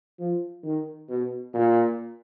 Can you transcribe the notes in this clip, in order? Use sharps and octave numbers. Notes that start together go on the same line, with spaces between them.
F3
D#3
B2
A#2